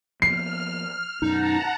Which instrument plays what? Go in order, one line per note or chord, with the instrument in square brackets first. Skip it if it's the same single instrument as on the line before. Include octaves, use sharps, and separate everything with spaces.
[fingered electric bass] F3 A#3 B3 [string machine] F6 [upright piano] C7
[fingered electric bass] F#2 B2 [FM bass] D#4 [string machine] F#5 A5 A#5